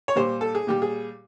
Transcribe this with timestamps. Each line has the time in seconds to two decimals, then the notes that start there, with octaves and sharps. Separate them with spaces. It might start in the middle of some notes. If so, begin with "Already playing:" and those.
0.08 C#5
0.16 A#2 G3 C5
0.41 A4
0.55 G#4
0.67 A#2 G3 G4
0.82 G#4